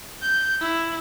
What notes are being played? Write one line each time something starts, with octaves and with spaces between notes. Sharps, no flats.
G6
E4